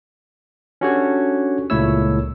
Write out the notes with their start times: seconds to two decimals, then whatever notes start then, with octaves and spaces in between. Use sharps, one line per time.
0.81 C#4 D4 F#4 G4 A4 C#5
1.70 C#2 A#2 A3 E4 C#5 E6